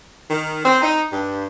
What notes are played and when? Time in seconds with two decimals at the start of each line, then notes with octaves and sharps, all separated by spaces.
0.30 D#3
0.65 C4
0.82 D#4
1.13 G2